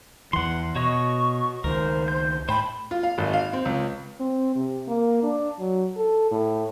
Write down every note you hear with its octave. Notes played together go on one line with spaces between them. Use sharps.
E2 E3 F#5 C6
B2 F#4 C#5 D#5 C#6
C#2 D#3 A#4 C5
G6
A2 C5 G5 A5 B5
F4
F5
G#1
F5
C4
C#2
C4
C3
A#3
D4
F#3
A4
A2